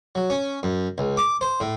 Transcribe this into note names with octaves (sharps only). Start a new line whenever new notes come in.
F#3
C#4
F#2
C#2
D6
C5
A2